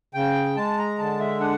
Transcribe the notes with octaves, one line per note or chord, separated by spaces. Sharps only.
C#3 G5
G#3 A5
A#5
D3 A5
E5
D4 F#5